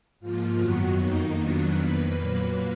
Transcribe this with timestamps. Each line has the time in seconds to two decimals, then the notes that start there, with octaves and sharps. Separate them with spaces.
0.20 G#2 F3 A#3 F4
0.58 F#2 D#3 F#3 B3 F#4
0.97 F2 D#3 A#3 D#4
1.36 F2 D#3 F#3 B3 D4
1.75 F2 D#3 A#3 B4
2.14 A#2 F#3 A#3